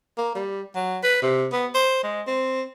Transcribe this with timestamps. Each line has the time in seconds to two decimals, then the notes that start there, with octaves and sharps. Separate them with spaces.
0.18 A#3
0.35 G3
0.76 F#3
1.03 B4
1.22 C3
1.53 B3
1.75 C5
2.04 G#3
2.27 C4